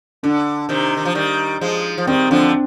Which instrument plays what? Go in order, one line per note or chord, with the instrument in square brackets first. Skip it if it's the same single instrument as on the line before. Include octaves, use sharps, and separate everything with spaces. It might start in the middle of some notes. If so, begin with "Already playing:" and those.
[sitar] D3 [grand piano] D4
[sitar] C3 D#3
D#3
F3
D#3 G3
F3 G#3
F3
[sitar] D#3 G3 [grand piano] C4
[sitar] D3 F3 [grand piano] D4